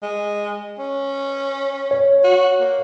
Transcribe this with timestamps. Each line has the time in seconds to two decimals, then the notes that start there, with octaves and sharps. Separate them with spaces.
0.03 G#3
0.79 C#4
1.91 C#5
2.24 F#4
2.60 A#3